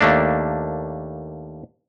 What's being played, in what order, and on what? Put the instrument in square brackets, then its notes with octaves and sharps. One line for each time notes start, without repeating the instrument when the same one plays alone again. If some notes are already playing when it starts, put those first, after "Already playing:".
[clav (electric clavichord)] D#2 A3 A#3 D4